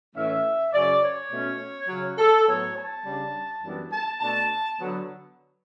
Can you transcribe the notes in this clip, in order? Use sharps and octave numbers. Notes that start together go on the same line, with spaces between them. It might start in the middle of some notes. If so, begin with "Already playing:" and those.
A2 E3 A3 C#4 E5
F#2 C#3 F#3 C#4 D5
C#5
B2 A3 C#4
C#3 F#3 C#4
A4
A2 F#3 B3 C#5
A5
C#3 G3 D4
F#2 E3 G3 B3 D4
A5
B2 A3 D4 A5
D3 F#3 B3